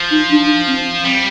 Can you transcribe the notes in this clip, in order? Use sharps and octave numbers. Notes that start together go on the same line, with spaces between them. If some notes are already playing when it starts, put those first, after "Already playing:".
Already playing: F3
D#4
D4
C4
G3 C4